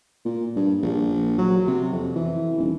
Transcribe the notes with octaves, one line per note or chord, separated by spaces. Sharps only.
A#2
G2
A#1
F#3
C3
F2
E3
D#1